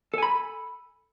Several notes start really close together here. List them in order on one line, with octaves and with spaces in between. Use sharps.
A4 G#5 B5